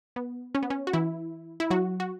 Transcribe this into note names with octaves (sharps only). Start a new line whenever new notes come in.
B3
C#4
B3
C#4
F#4
E3 E4
E4
F#3 F#4
F#4